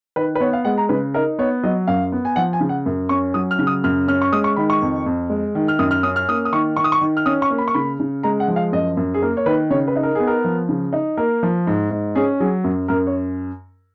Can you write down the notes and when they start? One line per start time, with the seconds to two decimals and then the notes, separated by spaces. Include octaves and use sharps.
0.16 D#3 B4
0.35 B4
0.40 B3 C#5
0.53 F5
0.65 G#3 F#5
0.78 A#5
0.89 C#3 B4
1.14 D#4 A#4
1.39 B3 C#5
1.64 F#3 D#5
1.88 F#2 F5
2.12 B3
2.25 G#5
2.36 F3 F#5
2.53 G#5
2.60 C#3
2.69 F#5
2.86 F#2
3.09 C#4 C#6
3.34 F#3 D#6
3.51 F6
3.59 C#3
3.67 D#6
3.84 F#2 F6
4.08 C#4 F6
4.22 C#6
4.32 G#3 D#6
4.44 C#6
4.56 D#3 B5
4.70 C#6
4.82 F2
5.06 F2
5.30 G#3
5.55 D#3
5.68 F6
5.79 F#2 D#6
5.91 F6
6.03 C#4 D#6
6.16 F6
6.29 A#3 D#6
6.45 D#6
6.53 D#3 C#6
6.77 D#3 C#6
6.84 D#6
6.92 C#6
7.01 D#3
7.17 F6
7.26 C#4 D#6
7.42 C#6
7.50 A#3
7.58 B5
7.68 C#6
7.74 C#3 B5
8.00 C#3
8.23 G#3 A#5
8.40 F#5
8.48 F3
8.56 F5
8.72 F#2 D#5
8.97 F#2
9.14 G#4
9.22 A#3 A#4
9.37 C#5
9.46 D#3 B4
9.70 C#3 C#5
9.88 B4
9.96 D#4
10.03 A#4
10.15 B3 G#4
10.27 A#4
10.44 F3
10.69 C#3
10.93 D#4
11.17 A#3 A#4
11.43 F3
11.67 G#2
11.91 G#2
12.15 C#4 G#4
12.40 F#3 G#4
12.64 F#2
12.88 F#2 A#4
13.07 C#5